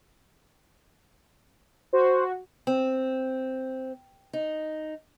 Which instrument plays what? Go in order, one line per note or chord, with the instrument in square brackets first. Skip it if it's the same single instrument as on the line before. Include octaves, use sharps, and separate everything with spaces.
[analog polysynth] F#4 [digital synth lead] C5
[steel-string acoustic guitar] C4
D#4